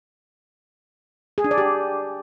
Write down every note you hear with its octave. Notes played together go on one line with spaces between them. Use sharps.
G#4
D4
D5
G4